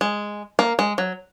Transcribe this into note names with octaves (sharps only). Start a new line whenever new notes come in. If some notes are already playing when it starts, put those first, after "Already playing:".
G#3
A#3
G#3
F#3